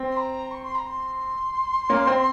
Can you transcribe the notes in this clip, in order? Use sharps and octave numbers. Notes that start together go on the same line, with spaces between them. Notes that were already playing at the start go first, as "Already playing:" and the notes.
Already playing: C4
C6
A#5
C#6
C6
A#5
C6
A#3 C#4
C4